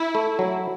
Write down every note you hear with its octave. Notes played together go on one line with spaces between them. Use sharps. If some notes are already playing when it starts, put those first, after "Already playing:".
Already playing: E4
A3
F#3